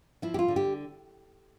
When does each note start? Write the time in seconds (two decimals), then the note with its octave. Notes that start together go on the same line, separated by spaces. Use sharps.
0.22 F3 E4
0.34 G4
0.39 F4
0.48 D3
0.56 G4